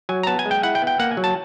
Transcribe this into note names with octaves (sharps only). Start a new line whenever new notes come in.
F#3 G#5
A#5
B3 A5
G#5
G#3
G5
E4 F#5
G5
B3
G5
A#3 F#5
G#5
F#3
A5